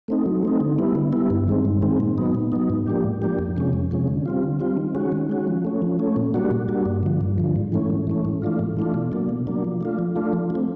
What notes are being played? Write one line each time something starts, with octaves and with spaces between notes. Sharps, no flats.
A3 C4 D#4
F#3
A3 C4 D#4
D3
G3 B3 E4
D3
G3 B3 E4
G2
D#3 G#3 C4
G2
D#3 G#3 C4
A#2
F#3 B3 D#4
A#2
F#3 B3 D#4
G#2
F3 A#3 D4 G4
G#2
F3 A#3 D4 G4
F2
C3 F3 G#3 C#4
F2
C3 F3 G#3 C#4
D3
G3 C4 F4
D3
G3 C4 F4
D#3
G#3 C#4 F#4
D#3
G#3 C#4 F#4
F3
A3 C#4
F3
A3 C#4
A#2
G3 A#3 D4 F#4
A#2
G3 A#3 D4 F#4
G2
D3 F3
G2
D3 F3
G#2
E3 A3 C#4
G#2
E3 A3 C#4
G#2
E3 A3 D4 F4
G#2
E3 A3 D4 F4
B2
F#3 A#3 D4
B2
F#3 A#3 D4
F3
A3 D4 F4
F3
A3 D4 F4
F3
A3
C4